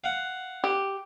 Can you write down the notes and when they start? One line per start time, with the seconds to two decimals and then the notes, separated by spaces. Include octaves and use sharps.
0.04 F5 F#5
0.64 G4